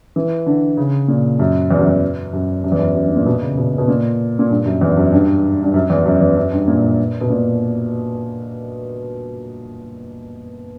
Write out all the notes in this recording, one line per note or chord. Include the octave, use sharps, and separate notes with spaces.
E3
D3
C#3
A#2
F#2
E2
F#2
E2
F#2
F#2
E2
F#2
F#2
G2
A#2
B2
C#3
B2
B2
A#2
A#2
G2
F#2
E2
F#2
G2
G2
F#2
E2
F#2
E2
F#2
G2
A#2
B2
A#2